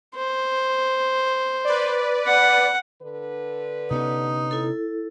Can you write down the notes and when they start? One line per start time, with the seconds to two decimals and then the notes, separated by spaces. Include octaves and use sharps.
0.16 C5
1.65 B4 D5
2.26 F#5
3.01 D3 B4
3.91 C3 B3 C#4 D#4 G4 C#5
4.51 E4 A4